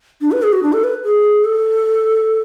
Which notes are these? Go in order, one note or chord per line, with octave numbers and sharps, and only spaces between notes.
D4
B4
G#4
F#4
D4
A4
B4
G#4
A4